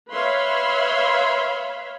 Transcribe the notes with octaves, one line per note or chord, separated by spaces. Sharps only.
B4 C#5 E5 F5 B5 C6